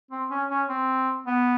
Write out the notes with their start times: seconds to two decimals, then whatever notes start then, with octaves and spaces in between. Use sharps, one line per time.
0.11 C4
0.30 C#4
0.49 C#4
0.69 C4
1.26 B3